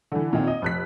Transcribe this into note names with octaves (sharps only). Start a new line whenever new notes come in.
D3 E3
A#2 D#3 C4
D#5
F1 F#6 B6